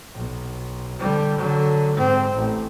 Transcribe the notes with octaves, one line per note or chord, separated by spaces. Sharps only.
B1
D3 G3
D3 F#3
G#2 C4
A1